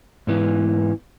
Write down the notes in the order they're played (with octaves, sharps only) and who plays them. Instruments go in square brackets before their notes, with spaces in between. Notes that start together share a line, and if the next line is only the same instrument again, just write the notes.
[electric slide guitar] G#2 E3 B3